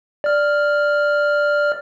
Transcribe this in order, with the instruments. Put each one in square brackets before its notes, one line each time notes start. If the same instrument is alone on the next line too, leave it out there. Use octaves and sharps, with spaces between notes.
[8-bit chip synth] D5 F6